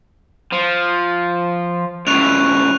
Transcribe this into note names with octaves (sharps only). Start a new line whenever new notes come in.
F3
C#2 A2 C#6 F#6 F7